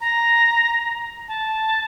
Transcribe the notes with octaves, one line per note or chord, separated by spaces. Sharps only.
A#5
A5